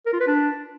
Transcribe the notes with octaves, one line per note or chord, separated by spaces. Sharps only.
A#4
F4
B4
D4